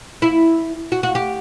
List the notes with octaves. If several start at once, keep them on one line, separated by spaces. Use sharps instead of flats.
E4
F#4
F#4
G4